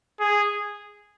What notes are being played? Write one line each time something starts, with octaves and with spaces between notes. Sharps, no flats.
G#4